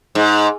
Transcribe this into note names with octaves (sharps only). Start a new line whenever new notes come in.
G#2